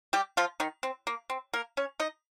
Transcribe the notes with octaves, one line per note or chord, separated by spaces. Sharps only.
G3 G4
F3 F4
D#3 D#4
C4
A#3
C4
A#3 A#4
C#4 C#5
D#4 D#5